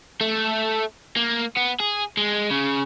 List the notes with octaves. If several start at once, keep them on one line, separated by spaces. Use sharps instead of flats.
A3
A#3
B3
G#4
G#3
C#3